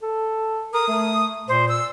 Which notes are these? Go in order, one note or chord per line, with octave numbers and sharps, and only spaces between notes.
A4
A#4 D#6
A3
A#2 C5
E6